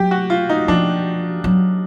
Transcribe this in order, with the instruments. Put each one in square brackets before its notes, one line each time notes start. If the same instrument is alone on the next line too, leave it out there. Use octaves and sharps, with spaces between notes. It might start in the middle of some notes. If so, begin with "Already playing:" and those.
Already playing: [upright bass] F#3 [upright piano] G4
[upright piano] F#4
F4
D#4
[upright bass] F3 [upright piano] D4
[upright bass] F#3